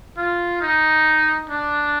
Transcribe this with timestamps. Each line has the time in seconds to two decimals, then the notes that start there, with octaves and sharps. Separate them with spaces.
0.17 F4
0.61 D#4
1.50 D4